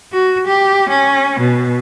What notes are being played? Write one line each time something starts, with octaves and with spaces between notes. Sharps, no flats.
F#4
G4
C#4
B2